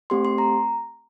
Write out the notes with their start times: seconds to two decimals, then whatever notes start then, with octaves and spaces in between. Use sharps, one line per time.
0.10 A3 C4 G4 C6
0.25 C6
0.38 A#5